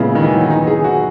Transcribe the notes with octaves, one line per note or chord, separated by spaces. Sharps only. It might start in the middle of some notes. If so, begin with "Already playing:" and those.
Already playing: A#2 C#3 G#3 B3 E4
D#3
E3
F#3
E3
D#4
G#4
F#4